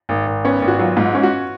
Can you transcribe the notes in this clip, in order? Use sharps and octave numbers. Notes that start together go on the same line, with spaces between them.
G#1
G#1
B3 C#4
G#1
F#4
F#3 F4
G#2 F4
C#4
F#4